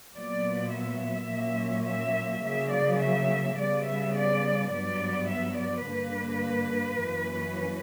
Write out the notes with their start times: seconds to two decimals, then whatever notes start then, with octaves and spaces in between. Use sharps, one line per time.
0.15 A#2 F#3 B3 D5
0.72 E5
1.29 A#2 F#3 A#3 C#4
1.86 E5
2.43 C#3 F#3 A#3 E5
2.72 D5
3.01 E5
3.57 C#3 G3 B3 D5
3.86 E5
4.15 D5
4.71 G2 F#3 B3 D5
5.28 E5
5.57 D5
5.85 G2 D3 A#3 B4
6.99 F#2 E3 A#3 C#4